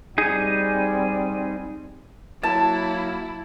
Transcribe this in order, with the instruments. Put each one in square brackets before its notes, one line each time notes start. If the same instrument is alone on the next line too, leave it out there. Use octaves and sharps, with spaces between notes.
[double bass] G3 C4 [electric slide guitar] D#4 G#4
[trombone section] F#3 A#3 [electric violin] E4 [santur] A5